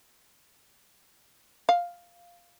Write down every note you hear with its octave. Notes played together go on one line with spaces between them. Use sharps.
F5